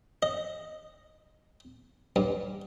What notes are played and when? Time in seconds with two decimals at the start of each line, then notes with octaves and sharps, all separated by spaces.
0.22 D#5
2.16 G2